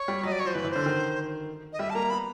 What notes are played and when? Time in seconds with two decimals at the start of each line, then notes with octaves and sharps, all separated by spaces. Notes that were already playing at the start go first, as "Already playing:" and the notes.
Already playing: C#5
0.08 G3
0.23 F#3 D#5
0.32 D5
0.40 C#5
0.45 F3 C5
0.54 E3 B4
0.65 E3
0.71 C5
0.76 D3
0.86 D#3
1.73 D#5
1.79 G3 E5
1.90 A5
1.95 A#3 A#5
2.10 B3 B5